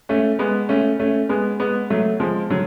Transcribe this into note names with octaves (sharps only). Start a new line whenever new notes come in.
A3 C#4
G#3 B3
A3 C#4
A3 C#4
G#3 B3
G#3 B3
F#3 A3
F3 G#3
D3 F#3